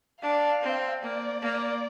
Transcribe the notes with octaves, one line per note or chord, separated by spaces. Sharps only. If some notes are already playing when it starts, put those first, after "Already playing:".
D4 F5
C4
A#3 D5
A#3